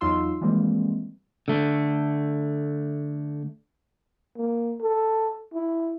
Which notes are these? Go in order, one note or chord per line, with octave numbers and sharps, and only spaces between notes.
E2 F#3 D#4 F4 C6 E6
E3 F3 G3 G#3 A#3 C4
D3 A3
A#3
A4
E4